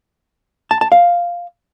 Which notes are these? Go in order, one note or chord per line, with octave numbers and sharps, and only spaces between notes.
A5
A5
F5